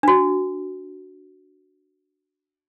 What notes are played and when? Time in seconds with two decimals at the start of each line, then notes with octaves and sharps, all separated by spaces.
0.03 D4 F#4